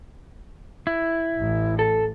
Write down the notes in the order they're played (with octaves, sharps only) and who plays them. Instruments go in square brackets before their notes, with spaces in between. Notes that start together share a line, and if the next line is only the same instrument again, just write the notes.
[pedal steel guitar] E4
[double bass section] A1
[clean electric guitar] A4